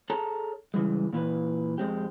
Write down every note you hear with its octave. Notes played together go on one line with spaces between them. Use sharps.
G#4 A4 C#5 A5 A#5
C#3 E3 G3 G#3
A#2 E3 B4
F2 G#3 C4 G4